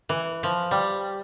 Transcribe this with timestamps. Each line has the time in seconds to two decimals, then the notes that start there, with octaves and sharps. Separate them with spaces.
0.09 E3
0.43 F3
0.71 G3